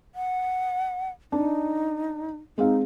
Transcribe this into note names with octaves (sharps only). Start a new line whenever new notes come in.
F#5
D4 D#4
G#3 C4 D#4 F5